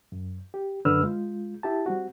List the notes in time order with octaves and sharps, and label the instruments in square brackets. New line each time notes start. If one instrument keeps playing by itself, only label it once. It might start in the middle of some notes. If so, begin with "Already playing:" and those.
[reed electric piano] F#2
G4
F#2 D3 B4 E6 F6
G#3 F4
E4 G4 A5
G3 C4 F#4